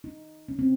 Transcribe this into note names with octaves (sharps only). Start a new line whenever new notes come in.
D#4
C#4
C4